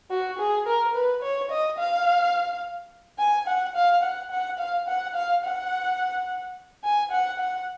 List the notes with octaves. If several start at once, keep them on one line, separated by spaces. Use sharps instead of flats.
F#4
G#4
A#4
B4
C#5
D#5
F5
G#5
F#5
F5
F#5
F#5
F5
F#5
F5
F#5
G#5
F#5
F#5